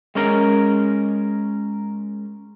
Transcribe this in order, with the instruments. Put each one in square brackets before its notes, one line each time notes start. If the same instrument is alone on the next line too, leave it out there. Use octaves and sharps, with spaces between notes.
[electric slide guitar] G#3 C#4 A#4